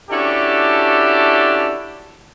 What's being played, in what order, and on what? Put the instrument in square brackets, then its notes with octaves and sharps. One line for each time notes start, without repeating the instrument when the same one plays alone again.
[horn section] C#4 D4 E4 F#4 G4 A4